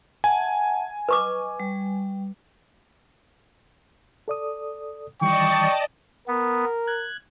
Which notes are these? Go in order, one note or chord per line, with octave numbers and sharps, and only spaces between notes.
E5 F#5 G#5 A5
B4 D#5 C#6 D6
G3
A4 D5 D#6
D#3 E3 G3 D5 D#5 G5 A5 C#6
B3 A#4
F#6 G#6